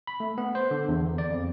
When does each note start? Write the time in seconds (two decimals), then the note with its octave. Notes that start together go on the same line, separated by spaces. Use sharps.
0.07 B5
0.20 A3
0.38 B3
0.55 C5
0.71 D3
0.89 E2
1.18 D5
1.30 F2